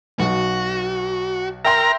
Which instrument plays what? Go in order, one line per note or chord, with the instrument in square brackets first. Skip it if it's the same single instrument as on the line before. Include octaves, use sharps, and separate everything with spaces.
[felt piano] B1 [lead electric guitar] F#4
[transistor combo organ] A#4 A#5 [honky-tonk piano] E5 G5 C6